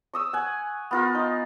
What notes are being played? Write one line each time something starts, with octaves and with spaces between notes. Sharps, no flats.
C#6 D#6 E6
F#5 G#5
B3 F4 A#4
D#4